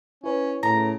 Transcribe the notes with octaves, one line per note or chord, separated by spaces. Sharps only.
C#4 E4 B4 C#5
A2 C#3 A#5